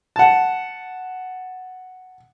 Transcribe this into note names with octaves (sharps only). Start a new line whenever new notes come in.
F#5 A5